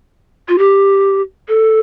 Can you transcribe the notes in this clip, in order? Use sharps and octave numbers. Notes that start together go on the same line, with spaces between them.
F4
G4
A4